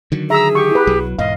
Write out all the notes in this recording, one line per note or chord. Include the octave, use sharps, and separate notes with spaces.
D3 D#3 F#3
G#4 E5 A#5 E6
G4 C#6
E4 B4
B1 F#3
E1 G#2 D#5 F5